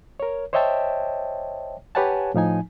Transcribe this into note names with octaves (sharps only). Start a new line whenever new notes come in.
A#4 C#5
C5 C#5 D#5 E5 G5 A5
G4 B4 C#5 F#5 G#5 A5
A2 F3 D#4 G#5